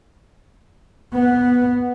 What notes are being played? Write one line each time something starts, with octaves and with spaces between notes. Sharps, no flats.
B3